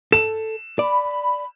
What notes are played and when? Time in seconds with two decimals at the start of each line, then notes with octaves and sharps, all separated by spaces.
0.12 A4 E7
0.79 D5 B5